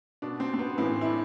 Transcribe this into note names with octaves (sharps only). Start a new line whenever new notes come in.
B2 D4
C4
C4
B3
A2 E3 C4
E4
D4